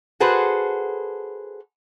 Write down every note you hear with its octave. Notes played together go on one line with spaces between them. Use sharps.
F#4 G#4 A4 B4 C5